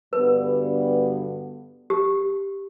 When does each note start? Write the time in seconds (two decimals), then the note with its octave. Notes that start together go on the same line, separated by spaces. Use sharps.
0.13 G2 D3 G3 B3 F#4 B4
1.90 G4